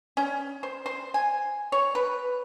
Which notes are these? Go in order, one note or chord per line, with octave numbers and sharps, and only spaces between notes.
C#4
C5
C5
G#5
C#5
B4